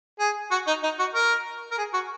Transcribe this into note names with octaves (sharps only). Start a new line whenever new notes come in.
G#4
F#4
D#4
D#4
F#4
A#4
A#4
G#4
F#4